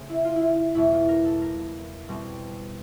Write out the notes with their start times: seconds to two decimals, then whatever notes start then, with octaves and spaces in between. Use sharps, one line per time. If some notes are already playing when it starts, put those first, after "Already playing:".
Already playing: C#3 A3 C4 G#4
0.09 E4
0.25 F4
0.36 E4
0.42 F4
0.75 E2 B2 G3 B3 E4
0.92 F4
1.08 A#4
1.25 A4
1.42 A#4
2.08 B2 G3 C4